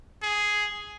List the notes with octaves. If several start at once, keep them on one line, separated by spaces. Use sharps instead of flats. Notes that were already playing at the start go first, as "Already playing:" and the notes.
G#4